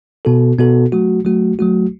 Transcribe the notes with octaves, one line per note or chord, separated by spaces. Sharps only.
B2 B3 F#4 A4
B2 B3 F#4 A4
F#3 A3 F#4
F#3 A3 F#4
F#3 A3 F#4